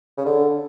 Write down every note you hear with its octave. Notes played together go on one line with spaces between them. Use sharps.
C#3
D3